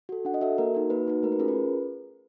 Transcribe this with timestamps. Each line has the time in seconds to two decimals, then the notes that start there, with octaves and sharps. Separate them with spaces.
0.09 F#4 A4
0.25 D4 F#5
0.34 D#5
0.41 F#4 A4 E5
0.58 A#3 A#4
0.74 D#4 F#4
0.90 A#3 B4
1.08 D#4 F#4
1.23 A3 A#4
1.32 B4
1.39 C#4 F4 G#4 A#4
1.48 B4